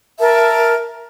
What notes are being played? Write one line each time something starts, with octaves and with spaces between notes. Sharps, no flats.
A#4 E5 A5